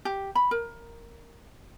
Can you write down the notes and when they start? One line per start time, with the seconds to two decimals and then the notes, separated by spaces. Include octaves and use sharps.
0.05 G4
0.35 B5
0.51 A#4